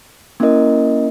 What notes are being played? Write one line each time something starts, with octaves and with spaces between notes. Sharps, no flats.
A#3 C#4 E4 A#4 D#5